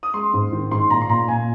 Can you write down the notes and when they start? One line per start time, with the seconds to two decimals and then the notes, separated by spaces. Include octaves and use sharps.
0.03 D#6
0.14 G#3 C6
0.34 G#2
0.52 D#3
0.71 G#2 C6
0.90 A#2 A#5
1.02 C6
1.09 A#2 A#5
1.28 A#2 G#5